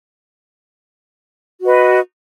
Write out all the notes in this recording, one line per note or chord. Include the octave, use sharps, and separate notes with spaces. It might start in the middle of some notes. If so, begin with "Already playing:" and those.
F#4 B4 D#5